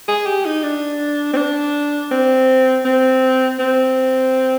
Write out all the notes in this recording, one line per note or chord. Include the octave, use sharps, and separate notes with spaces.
G#4
G4
D#4
D4
C4
D4
C4
C4
C4